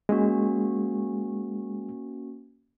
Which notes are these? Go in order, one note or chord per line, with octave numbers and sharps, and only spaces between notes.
G#3 A#3 C#4 F#4